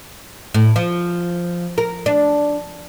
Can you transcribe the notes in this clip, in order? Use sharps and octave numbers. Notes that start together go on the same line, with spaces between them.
A2
F3
A#4
D4